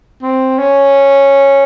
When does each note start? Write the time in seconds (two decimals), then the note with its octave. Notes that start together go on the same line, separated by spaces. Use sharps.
0.22 C4
0.59 C#4